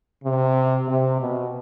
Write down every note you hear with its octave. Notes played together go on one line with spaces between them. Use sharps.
C3
C3
B2